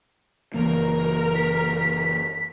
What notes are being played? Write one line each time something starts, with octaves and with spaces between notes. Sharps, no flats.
F#1 E3 A#3 A#4
B6